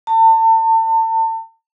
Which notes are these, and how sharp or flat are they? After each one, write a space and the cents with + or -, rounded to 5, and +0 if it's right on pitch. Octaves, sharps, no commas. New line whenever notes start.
A5 +35